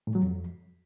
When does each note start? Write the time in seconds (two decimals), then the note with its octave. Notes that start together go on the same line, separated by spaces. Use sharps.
0.07 A2
0.15 F#3
0.23 F2